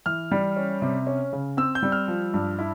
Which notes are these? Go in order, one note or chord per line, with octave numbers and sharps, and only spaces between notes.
E3 F6
G3
C#4
C3
C#4
C#3
C4 E6
G6
G3
F6
F3
G2
E4